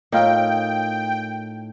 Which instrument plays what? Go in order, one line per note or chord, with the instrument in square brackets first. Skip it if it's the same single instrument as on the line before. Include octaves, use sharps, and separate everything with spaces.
[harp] A2 [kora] D#4 F4 A#4 [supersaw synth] G5